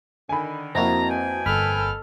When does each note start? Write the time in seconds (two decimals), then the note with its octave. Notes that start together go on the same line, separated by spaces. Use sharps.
0.29 D3 D#3 G#5 B5
0.75 F2 A#3 C4 E4 F#4 A#5
1.10 B4 G5 G#5
1.46 G1 A4 B5 F6